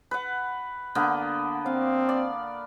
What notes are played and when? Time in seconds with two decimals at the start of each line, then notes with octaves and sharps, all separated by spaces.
0.11 B4 F#5
0.95 D3 A#3 B3
1.66 C4 F5
2.09 D5